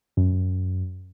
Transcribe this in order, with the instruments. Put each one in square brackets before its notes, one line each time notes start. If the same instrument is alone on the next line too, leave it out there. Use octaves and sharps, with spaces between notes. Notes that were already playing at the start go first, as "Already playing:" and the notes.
[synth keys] F#2